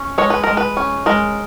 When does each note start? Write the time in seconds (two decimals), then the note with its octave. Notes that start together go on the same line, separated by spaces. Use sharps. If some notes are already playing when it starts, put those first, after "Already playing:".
Already playing: C#4
0.18 G#3 C#5
0.30 B4
0.44 G#3 A#4
0.57 B4
0.77 C#4
1.06 G#3 A#4